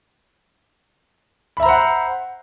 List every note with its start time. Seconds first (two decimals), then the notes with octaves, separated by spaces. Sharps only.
1.57 B5
1.60 E5
1.63 A#5
1.66 C5
1.69 F#5